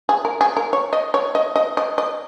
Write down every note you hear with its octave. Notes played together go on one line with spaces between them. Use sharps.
G#4
A#4
G#4
A#4
C#5
D#5
C#5
D#5
D#5
D#5
D#5